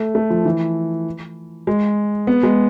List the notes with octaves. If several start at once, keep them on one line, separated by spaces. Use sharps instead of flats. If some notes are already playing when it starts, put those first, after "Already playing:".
Already playing: A3
A3
F3
E3
G#3
B3
G#3